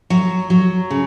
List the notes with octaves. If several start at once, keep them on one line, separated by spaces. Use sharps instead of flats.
F#3
F#3
C#3